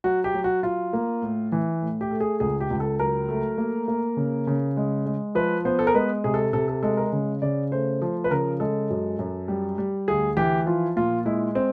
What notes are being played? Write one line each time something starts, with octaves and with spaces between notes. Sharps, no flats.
F#3 F#4
G4
F#3
F#4
F#3 F4
A#3
A2
E3
A2
G4
A3
G#4
C#2 G#4
G4
C#2
A4
F#3 A#4
A3
A#3
A#3
C#3
C#3
G#3
G#3
F3 B4
B3 C5
A4
A#4
G#3 B4
C3 G#4
A4
C3 A4
A4
G#3 A4
A#4
C#3
C#3 D5
A3 C5
F3
B4
C#3 A#4
G#3 A4
F#2
F#2
G3
G3
D2 G#4
E3 G4
F3 F4
A#2 F4
G#3 E4
C4